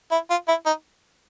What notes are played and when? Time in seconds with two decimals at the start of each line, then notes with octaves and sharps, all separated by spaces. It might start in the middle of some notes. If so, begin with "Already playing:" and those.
0.12 E4
0.30 F4
0.48 E4
0.66 D#4